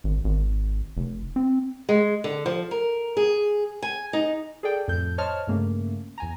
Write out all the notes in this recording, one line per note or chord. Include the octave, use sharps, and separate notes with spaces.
G#1
G#1
F1
C4
G#3
D3
F3
A#4
G#4
G#5
D#4
G#4 A4 D5 G5
F2 A2 A4 G6
C5 C#5 D#5 A5 F6
G2 C#3 A3 A#3 C#4
E2 G#5 A#5